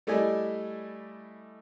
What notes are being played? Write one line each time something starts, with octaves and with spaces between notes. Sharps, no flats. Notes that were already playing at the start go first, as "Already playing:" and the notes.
G3 A3 E4 D5 D#5 G#5